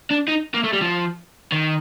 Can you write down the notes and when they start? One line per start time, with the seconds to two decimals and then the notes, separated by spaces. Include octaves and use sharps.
0.11 D4
0.28 D#4
0.54 A#3
0.64 A3
0.73 G3
0.82 F3
1.52 D#3